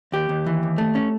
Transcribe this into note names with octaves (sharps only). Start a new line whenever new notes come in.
D#2 G4
D#2
E3
D#2
A3
C#4